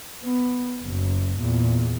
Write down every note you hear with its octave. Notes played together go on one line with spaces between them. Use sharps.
B3
F#1 F#2
E2 A#2